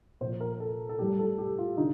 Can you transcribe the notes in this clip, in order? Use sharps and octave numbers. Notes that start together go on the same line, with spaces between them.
A#2 F3 C5
A#4
A4
A4
A2 G3 G4
A4
G4
F4
D3 D#4